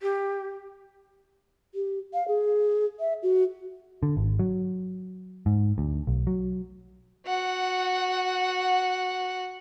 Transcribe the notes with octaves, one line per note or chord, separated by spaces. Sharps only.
G4
G4
F5
G#4
E5
F#4
D3
G#1
F#3
G#2
D2
B1
F#3
F#4 F#5